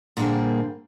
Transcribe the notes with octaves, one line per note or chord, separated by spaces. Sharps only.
A#2 D3 G3 A#3 C4 G#4